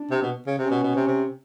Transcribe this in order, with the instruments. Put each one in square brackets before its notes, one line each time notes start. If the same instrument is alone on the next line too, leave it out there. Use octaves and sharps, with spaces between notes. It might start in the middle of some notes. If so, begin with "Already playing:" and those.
Already playing: [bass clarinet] D4
[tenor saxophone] C3
B2
C#3
[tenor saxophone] C3 [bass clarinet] C#4
[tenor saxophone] B2
B2
C3
C3